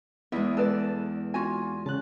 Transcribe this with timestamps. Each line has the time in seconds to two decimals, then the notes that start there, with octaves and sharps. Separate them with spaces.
0.32 E2 G#3 B3 E4 E5
0.57 A4 B4 D5 E6
1.34 F4 F#4 G#5
1.86 C#3 A5 F#6